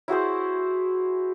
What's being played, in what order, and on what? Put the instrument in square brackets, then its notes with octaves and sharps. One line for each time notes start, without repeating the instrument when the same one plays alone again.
[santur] E4 F#4 G#4 C5